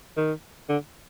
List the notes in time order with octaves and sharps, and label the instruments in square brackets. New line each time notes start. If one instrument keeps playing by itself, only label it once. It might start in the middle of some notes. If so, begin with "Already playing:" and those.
[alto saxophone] D#3
D3